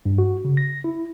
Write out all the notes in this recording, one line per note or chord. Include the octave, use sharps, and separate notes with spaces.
G2
F#4
C#3
A#6
E4